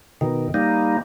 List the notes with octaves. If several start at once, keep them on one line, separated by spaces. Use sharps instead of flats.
B2 D#3
G3 A#3 D#4